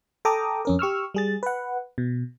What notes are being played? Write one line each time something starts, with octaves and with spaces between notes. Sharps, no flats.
A4 G5 A#5 D6 D#6
F2 C#4 A#4
G4 C#6 E6 F6
G3 G#4 A6
B4 F#5
B2